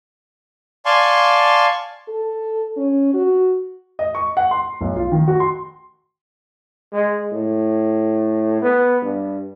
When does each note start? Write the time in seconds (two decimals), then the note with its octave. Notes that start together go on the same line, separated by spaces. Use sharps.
0.85 D5 F5 G#5 A5 C6 C#6
2.08 A4
2.77 C#4
3.14 F#4
3.99 D#5
4.15 C#6
4.37 F#5
4.51 C6
4.81 B1
4.96 F4
5.12 D#3
5.28 F#4
5.40 C6
6.93 G#3
7.33 A2
8.62 B3
9.02 G2